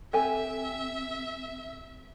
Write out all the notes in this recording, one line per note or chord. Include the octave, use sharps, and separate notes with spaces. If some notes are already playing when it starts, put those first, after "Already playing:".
C4 G4 A4 E5 G#5